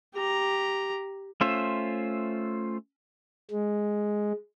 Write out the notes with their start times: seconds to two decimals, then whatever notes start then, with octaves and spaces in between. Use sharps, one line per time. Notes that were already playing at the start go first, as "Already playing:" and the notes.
0.14 G4 A#5
1.41 A3 C#4 F4 C5 E5
3.50 G#3